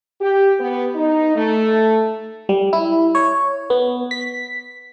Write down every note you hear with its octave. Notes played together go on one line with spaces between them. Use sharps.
G4
B3
D#4
A3
G3
E4
C#5
B3
B6